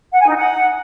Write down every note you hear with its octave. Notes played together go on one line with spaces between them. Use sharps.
F#5
G#5
D#4
F#5